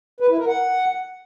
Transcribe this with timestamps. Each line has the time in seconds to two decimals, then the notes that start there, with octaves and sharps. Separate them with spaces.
0.20 B4
0.29 E4
0.38 A#4
0.47 F#5